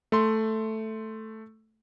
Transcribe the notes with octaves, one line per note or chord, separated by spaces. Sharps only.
A3 C6